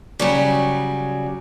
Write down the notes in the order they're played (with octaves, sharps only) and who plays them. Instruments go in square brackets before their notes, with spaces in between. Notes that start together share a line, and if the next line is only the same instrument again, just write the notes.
[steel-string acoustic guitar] C#3 F#3 G3